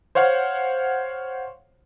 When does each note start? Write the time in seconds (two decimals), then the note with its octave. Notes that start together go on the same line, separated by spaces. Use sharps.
0.15 C5 C#5 F5 F#5